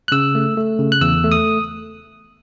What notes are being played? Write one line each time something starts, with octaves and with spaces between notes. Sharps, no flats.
F#6
C#3 E6
A3
A3
C#3
F#6
E2 E6
A3
D#6